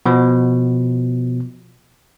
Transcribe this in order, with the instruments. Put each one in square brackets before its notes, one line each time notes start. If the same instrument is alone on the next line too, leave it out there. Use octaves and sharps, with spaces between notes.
[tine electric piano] B2 F3